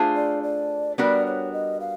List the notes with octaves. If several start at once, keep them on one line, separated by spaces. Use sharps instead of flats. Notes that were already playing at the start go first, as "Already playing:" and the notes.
Already playing: A3 D4 F4 G#4 C5
D5
D5
G3 B3 D4 F#4 A#4 D5
C#5
D#5
F5